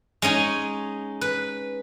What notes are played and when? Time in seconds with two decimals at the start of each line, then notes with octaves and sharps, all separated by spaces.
0.22 G#3 C#4 D#4 G#5
1.21 B4